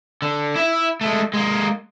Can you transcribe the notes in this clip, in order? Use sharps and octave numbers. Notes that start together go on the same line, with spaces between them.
D3
E4 E5
G#3 A3
G#3 A#3